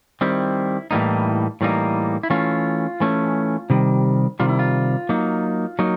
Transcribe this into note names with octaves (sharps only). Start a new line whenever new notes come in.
D#3 G3 C4 E4
A2 E3 G3 A#3 D#4
A2 E3 G3 A#3 D#4
E4
E3 A3 C#4 F4
E3 A3 C#4
C3 D#3 G3
C3 D#3 G3 F4
E4
F4
F#3 A#3 D#4
F#3 A#3 D#4